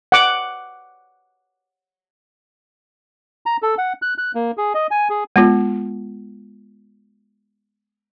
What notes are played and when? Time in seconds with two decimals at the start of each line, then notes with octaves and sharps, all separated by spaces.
0.12 F#5 D6
3.46 A#5
3.63 A4
3.78 F#5
4.02 F#6
4.18 F#6
4.35 A#3
4.57 G#4
4.75 D#5
4.91 G#5
5.10 G#4
5.36 G#3 B3 F4